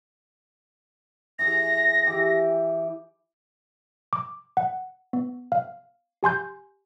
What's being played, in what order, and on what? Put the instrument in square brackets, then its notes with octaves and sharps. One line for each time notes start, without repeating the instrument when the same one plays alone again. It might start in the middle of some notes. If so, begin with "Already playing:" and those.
[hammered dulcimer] E3 G#4 [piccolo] A#6
[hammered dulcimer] E3 G4
[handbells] D6
F#5
B3
F5
G4 G#5 C6 G6